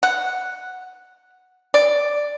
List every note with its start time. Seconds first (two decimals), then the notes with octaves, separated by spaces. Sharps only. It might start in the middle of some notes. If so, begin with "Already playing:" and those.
0.03 F#5
1.74 D5